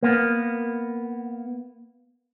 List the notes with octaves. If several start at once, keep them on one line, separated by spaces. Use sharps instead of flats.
A#3 B3